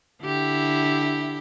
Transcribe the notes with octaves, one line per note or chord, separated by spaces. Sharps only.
D3 E4 G4